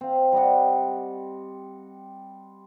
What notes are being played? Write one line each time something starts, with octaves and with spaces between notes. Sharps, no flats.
C4 F5
G3 D#5 F#5